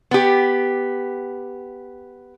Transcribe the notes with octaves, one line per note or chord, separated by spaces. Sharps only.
B3 G4